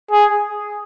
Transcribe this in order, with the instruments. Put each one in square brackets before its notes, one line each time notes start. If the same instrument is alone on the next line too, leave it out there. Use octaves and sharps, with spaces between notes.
[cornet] G#4